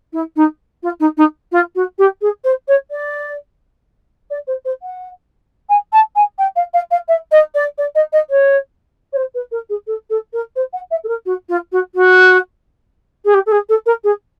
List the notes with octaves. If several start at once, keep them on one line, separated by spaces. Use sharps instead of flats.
E4
D#4
F4
D#4
D#4
F4
F#4
G4
G#4
C5
C#5
D5
D5
C5
C5
F#5
G#5
A5
G#5
G5
F5
F5
F5
E5
D#5
D5
D5
D#5
D#5
C#5
C#5
C5
B4
A#4
G#4
A4
A4
A#4
C5
F#5
E5
A4
A#4
F#4
F4
F#4
F#4
G#4
G4
A4
G#4
A4
A#4
G#4